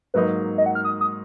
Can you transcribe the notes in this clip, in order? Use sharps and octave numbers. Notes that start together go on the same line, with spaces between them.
G#2 F#3 A#3 D#4 B4
D#5
F#5
F6
D#6
D#6